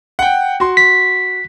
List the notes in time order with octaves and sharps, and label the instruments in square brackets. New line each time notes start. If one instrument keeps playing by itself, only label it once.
[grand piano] F#5 G5
F#4 C6
[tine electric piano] B6